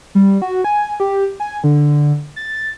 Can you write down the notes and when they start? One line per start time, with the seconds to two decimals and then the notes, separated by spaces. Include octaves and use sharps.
0.15 G3
0.42 F#4
0.64 G#5
1.00 G4
1.40 G#5
1.64 D3
2.36 A6